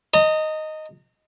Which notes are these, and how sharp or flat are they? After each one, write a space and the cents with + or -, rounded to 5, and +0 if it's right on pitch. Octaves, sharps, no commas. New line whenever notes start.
D#5 +0 A#5 -35